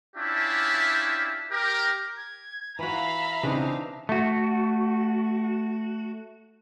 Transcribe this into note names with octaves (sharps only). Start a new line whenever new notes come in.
C#4 D4 E4 F4 G4 E5
G4 A#4
G#6
E3 F#4 E5 F5 A#5 B5
C#3 E3 C4 D4 D#4
A3 F#4